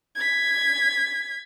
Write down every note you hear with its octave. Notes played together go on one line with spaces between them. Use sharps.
G#6 B6